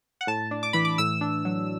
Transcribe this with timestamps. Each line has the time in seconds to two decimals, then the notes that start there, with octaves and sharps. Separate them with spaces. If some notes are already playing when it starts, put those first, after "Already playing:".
0.21 F#5
0.27 A2 A5
0.51 D4
0.63 D6
0.73 E3 B5
0.85 D6
0.98 A2 E6
1.21 D4
1.45 F#3